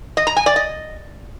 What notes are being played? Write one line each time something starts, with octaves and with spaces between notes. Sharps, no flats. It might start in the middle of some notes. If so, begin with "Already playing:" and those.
D#5
A#5
G#5
D5
D#5